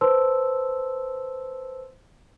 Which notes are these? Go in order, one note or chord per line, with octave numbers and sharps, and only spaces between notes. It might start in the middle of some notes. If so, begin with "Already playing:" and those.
B4 C5 A5 C6 E6